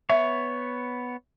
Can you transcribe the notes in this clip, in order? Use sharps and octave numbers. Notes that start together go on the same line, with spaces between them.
B3 C#5 E5